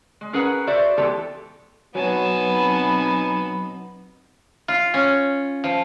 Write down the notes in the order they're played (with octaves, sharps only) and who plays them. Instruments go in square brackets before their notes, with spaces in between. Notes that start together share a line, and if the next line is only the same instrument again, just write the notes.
[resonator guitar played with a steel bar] G#3
C#4 G#4 A#4 B4 F#5
F#4 C5 D5 E5
E3 G#3 B3 G4 A4
[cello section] B2 C4 D#4 [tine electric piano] F#3 [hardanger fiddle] B3 B5 [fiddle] G#5 A5
[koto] F4
C#4
F3